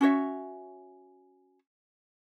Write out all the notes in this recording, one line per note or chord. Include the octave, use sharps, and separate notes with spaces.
C#4 F#4 C#5 E5